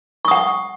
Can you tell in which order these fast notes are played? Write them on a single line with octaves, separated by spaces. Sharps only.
C#6 D#6 F#5